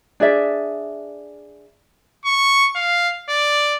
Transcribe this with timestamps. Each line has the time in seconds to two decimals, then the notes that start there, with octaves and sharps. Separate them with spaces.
0.20 D4 G#4 D5 E5
2.25 C#6
2.75 F5
3.29 D5